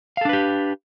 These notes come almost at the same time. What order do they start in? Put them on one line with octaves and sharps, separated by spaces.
F5 A4 D4 B4 G4